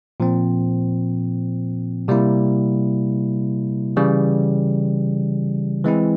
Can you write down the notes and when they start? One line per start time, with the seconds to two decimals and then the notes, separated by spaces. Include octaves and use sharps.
0.20 A#2 F3 C4
2.08 C3 G3 A#3 E4
3.97 C#3 E3 G3
5.84 E3 G#3 C4 E4